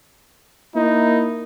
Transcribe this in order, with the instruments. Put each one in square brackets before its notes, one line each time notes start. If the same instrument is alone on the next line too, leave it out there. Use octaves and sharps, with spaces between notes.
[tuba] A#3 [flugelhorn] D#4 [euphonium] E4